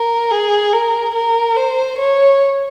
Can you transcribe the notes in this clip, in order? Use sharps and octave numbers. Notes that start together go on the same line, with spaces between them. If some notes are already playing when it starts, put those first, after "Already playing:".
Already playing: A#4
G#4
A#4
A#4
C5
C#5